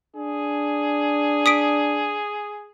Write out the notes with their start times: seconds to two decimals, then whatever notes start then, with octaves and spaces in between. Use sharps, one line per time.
0.16 D4 G#4
1.46 D#6 B6 D7